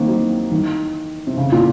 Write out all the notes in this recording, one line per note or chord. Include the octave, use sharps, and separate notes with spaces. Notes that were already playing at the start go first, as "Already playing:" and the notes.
Already playing: D#3 A#3 C4
F#3
D#3
C3
C#3
A#2